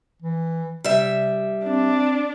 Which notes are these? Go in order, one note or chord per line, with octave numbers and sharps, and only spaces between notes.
E3
C3 G3 E5
C4 D4